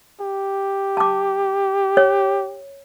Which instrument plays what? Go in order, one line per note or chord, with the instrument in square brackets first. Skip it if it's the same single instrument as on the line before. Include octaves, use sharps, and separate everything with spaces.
[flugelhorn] G4
[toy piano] A5 D6
C#5